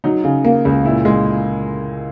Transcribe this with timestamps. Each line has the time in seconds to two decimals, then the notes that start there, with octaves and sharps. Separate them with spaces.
0.04 F#3 D#4
0.24 C#3
0.45 A#3
0.65 C#2
0.84 A#2 E4
1.05 G#3